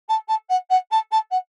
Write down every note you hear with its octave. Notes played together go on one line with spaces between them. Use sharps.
A5
A5
F#5
F#5
A5
A5
F#5